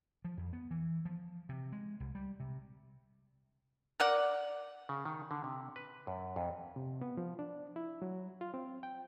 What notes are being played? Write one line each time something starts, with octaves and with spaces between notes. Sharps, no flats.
F3
F2
B3
E3
F3
C3
G#3
C2
G3
C3
A#4 D5 F#5
C#3
D#3
D3
C3
B4
F#2
F2
C3
B3
F3
D4
E4
F#3
F4
C4
G5